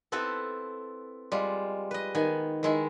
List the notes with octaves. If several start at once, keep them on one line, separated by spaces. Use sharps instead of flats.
B3 C4 E4 A4 B4
G3 G#3 F4
B4 D#5
D#3 B3 G#5
D#3 G#3 E4